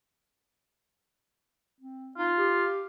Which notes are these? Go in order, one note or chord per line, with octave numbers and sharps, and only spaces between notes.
C4
D#4 F4
G4